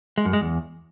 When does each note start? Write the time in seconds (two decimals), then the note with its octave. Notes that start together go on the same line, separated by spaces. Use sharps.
0.18 G#3
0.25 F#2
0.33 G#3
0.41 E2